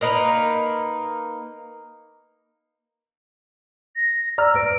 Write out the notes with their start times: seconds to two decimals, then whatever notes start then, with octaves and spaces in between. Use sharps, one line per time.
0.01 A#3 D#4 A#4 B4
3.96 A#6
4.38 D5 A#5 E6 F6
4.56 B4 D7